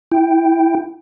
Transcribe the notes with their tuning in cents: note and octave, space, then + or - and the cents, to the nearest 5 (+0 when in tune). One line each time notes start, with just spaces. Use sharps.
E4 +0 G5 -5